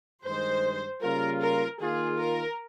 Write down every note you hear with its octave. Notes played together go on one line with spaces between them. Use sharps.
G2 D#3 G#3 C5
C#3 G3 A#3 F4 A#4
A#4
D#3 A#3 F4 G#4
A#4